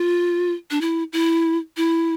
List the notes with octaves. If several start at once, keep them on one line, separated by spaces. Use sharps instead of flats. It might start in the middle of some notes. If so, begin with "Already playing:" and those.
Already playing: F4
D4
E4
E4
E4